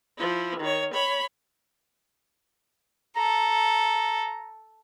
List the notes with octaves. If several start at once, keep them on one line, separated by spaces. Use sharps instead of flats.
F3 E4
D#3 C#5
C#5 B5
A4 A#5